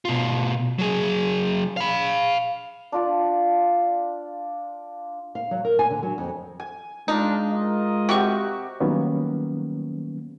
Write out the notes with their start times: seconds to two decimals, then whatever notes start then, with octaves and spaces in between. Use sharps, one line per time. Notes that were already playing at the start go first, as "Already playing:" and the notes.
0.05 B2 F4
0.79 F#3 G#4
1.77 F5 B5
2.92 D4 F4 D5
5.35 F5
5.51 F#3
5.65 A#4
5.79 G#5
5.90 D3
6.03 F#3
6.18 F2
6.60 G#5
7.08 G#3 D4 D#4 F4
7.51 F4 A#4 D#5
8.09 C3 C4 F#4 G4 C#6
8.80 D#3 F#3 G3 A#3 B3 C#4